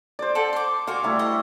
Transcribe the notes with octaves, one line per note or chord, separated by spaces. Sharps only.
C5 D5
A4 F#5
C6 D6
F#4 F5 G#5 C6 D6
G3 A3 E4
D#5